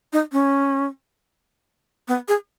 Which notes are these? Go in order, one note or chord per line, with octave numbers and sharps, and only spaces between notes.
D#4
C#4
B3
G#4